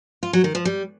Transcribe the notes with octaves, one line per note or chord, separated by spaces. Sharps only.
F4
F#3
D#3
F3
G3